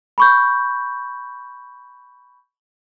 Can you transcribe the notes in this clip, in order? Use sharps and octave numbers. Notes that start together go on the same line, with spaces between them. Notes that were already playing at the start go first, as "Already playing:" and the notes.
B5 C#6 G6